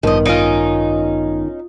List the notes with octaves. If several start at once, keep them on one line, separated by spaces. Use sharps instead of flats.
A1 G2 D#3 F3 B3 D#5
C#4 D#4 F4 D#5 D7